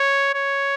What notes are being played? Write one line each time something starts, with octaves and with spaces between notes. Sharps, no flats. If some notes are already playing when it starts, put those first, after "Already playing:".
Already playing: C#5
C#5